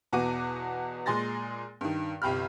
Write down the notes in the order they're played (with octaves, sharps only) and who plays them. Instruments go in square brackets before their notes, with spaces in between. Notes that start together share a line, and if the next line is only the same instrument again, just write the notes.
[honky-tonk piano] E2 B2 F#4 D6 D#7
A#2 G#3 G#4 C6 A6 A#6
G2 D#3
G1 C2 G4 B5 F6